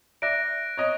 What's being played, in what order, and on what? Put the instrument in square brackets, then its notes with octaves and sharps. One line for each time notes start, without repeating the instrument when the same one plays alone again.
[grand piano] D5 E5 [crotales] F#6 A#6 D7
[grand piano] C#5 D#5